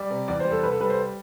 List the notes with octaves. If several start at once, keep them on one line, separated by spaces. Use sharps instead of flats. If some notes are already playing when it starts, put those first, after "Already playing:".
Already playing: G3 D5
C3
E2 D5
C5
G3
A4
C2 B4
A4
G3 B4
C5